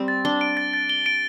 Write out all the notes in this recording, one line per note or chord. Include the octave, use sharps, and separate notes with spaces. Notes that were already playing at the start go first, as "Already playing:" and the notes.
Already playing: G3 C4
A6
D4 G7
D7
A6
A6
G7
D7